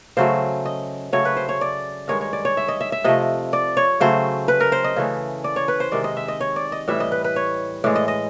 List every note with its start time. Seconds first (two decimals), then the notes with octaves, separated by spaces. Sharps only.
0.17 C#3 F#3 A3 C5
0.65 D#5
1.13 C#3 F#3 A3 C#5
1.25 B4
1.37 C5
1.49 C#5
1.61 D5
2.08 G2 D#3 G#3 C#5
2.21 C#5
2.33 D5
2.45 C#5
2.57 E5
2.68 D#5
2.81 E5
2.92 E5
3.04 C3 F3 A3 D#5
3.53 D5
3.77 C#5
4.00 C#3 F#3 A3 C5
4.48 B4
4.60 A#4
4.72 C5
4.84 D#5
4.96 C#3 E3 A3
5.44 D5
5.56 C#5
5.68 B4
5.80 C5
5.92 C3 D#3 G#3 D5
6.04 D#5
6.17 E5
6.28 D#5
6.40 C#5
6.56 D5
6.72 D#5
6.88 A2 E3 G3 E5
7.00 D#5
7.12 B4
7.24 B4
7.36 C#5
7.84 A2 E3 G#3 D5
7.96 D#5
8.08 D#5